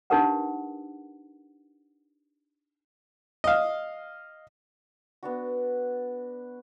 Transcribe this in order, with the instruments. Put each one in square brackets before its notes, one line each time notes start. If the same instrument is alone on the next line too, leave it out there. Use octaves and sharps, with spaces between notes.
[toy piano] D4 D#4 G4 A#4 B4 F#5
[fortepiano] D#5 F5
[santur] B3 D4 F#4